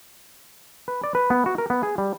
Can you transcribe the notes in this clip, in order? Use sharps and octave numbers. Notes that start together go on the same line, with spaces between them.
B4
D5
B4
B3
F#4
A#4
B3
G#4
G3